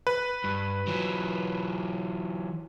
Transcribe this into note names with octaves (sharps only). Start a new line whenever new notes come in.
B4
G2
E3 F#3